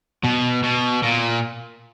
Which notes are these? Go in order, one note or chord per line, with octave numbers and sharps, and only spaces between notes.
B2
B2
A#2